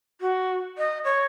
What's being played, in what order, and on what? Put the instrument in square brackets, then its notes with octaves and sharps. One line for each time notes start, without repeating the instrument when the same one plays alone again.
[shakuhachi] F#4
D#5
C#5